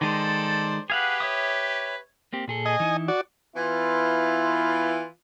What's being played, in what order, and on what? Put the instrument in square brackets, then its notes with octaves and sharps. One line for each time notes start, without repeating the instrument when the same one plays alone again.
[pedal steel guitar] D#3 G#3 [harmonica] A4 C5 D5
[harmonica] G4 B4 [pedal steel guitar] G#4 F5 F#5
[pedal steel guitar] C#5 E5 D#6
[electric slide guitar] A#3 C4 G4
A#2 G#4 A4
[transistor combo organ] D#5 G#5
[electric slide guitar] E3 D#4 E4
[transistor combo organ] F#4 D5
[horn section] E3 B3 E4 F4